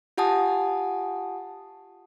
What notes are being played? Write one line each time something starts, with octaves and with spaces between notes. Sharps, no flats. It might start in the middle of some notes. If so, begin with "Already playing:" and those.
F4 G4 F#5 G#5 A5 D#6